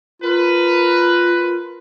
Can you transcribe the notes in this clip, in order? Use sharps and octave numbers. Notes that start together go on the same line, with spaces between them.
F4 A#4 B4